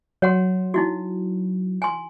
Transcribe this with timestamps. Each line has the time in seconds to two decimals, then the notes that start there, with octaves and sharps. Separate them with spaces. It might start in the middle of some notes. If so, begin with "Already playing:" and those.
0.22 F#3 C#5 F#5 C6
0.74 D#4 E4 F#4
1.82 G#5 C6